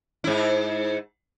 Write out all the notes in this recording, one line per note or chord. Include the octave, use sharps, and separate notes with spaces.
G#2 E4